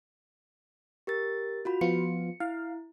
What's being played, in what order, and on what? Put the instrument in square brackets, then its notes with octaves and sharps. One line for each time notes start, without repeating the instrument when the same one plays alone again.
[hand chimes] G4 A#4 A6
F4 F#4 B5
[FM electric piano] F3 B3 F4 [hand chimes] C#7
[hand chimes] E4 [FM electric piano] F5